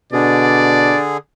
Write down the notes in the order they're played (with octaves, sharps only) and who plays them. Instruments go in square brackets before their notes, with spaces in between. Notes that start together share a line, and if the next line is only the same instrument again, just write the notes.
[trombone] B2 [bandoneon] D3 G#4 [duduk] D4 [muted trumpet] D5